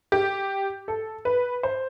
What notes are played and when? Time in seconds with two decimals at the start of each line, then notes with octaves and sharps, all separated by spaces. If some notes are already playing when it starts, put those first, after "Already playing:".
0.12 G4
0.88 A4
1.25 B4
1.63 C5